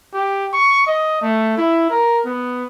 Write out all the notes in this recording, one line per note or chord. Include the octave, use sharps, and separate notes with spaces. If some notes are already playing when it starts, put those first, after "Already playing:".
G4
C#6
D#5
A3
E4
A#4
B3